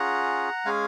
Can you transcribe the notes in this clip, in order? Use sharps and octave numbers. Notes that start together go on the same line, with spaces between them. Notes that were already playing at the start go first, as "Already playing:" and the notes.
Already playing: C#4 F4 G#4 F#5 A#5
G#3 C#4 G#4 F5 G#5